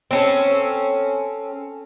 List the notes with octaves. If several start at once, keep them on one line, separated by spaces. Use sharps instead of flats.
C4 C#4 A4